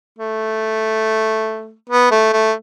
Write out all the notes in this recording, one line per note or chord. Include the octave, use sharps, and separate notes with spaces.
A3
B3
A3
A3